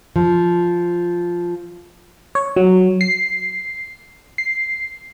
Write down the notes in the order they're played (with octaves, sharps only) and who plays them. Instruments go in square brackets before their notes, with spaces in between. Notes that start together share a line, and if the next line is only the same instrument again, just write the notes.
[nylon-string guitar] F3
[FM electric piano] C#5
F#3
C7
C7